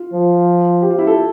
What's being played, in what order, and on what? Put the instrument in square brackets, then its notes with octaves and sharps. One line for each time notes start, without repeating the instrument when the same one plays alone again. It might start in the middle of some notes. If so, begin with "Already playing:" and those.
Already playing: [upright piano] F4
[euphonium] F3
[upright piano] G4
F4
E4
A4